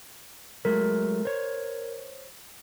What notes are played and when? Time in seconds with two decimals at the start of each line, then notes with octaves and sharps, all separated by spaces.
0.65 F#3 G#3 A3 A#4
1.25 C5 C#5